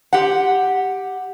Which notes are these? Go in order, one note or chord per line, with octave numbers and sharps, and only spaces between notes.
G4 F#5